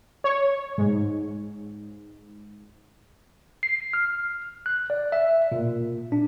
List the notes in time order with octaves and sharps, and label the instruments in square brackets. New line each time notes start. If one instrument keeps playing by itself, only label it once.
[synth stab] C#5
G#2
[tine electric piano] C7
F6
F#6
D5
E5
A#2
D4